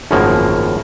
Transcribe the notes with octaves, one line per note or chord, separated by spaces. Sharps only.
G#1 F#2 A2 C#3 F3 A#3